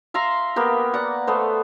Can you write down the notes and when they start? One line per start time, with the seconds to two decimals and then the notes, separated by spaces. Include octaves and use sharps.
0.14 E5 F5 A#5 C6
0.56 A#3 B3 G4
0.94 D5 F#5
1.27 A3 B3 C5